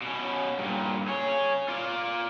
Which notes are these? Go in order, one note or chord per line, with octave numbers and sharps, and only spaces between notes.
B2 C#4
G2 A#2
G#4 C#5
F4 D5